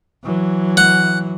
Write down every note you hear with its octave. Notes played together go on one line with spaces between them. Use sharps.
E3 F#3
F#5